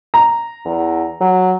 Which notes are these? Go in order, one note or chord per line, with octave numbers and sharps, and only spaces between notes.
A#5
E2
F#3